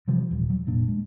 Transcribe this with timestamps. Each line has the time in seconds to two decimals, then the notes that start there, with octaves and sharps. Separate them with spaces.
0.08 C3 E3 F3 G3
0.31 D#1 G3
0.50 F#3
0.67 F1 A#2 D4
0.88 G#3